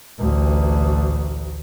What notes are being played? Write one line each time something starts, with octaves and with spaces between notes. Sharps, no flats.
A1 D2